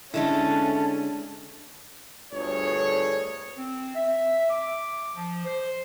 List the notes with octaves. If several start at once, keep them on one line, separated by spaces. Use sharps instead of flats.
D3 G#3 A3 C#4 E4 A5
G1 D2 G#4 C#5
C4
E5
D6
F3
C5